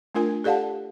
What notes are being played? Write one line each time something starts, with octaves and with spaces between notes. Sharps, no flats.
A3 D4 F4 A#4 G#5
G4 A4 D5 F5 F#5 A5